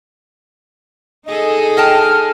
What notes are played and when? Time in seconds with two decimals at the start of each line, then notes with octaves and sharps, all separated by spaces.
1.26 D#4 G#4 A4 D#5
1.77 D#5 G5 A5 F6